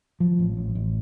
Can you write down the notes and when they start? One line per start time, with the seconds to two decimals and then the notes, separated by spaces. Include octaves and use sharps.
0.20 F3
0.39 A1
0.57 A1
0.75 A1